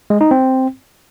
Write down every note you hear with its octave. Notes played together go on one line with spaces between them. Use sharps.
G#3
D#4
C4